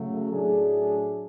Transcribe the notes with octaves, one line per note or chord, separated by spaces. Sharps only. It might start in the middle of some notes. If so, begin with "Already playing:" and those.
Already playing: C#3 F#3 A3
A2 F#3 A3 D4 G#4